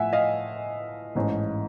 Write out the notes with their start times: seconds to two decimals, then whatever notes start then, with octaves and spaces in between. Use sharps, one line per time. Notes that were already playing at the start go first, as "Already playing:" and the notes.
Already playing: A2 F3 A3 E5 F#5 G#5
0.13 D#5 F5
1.15 A1 G#2 E3 A3 C#4